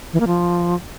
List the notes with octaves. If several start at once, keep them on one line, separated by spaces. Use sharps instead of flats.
E3
A#3
F3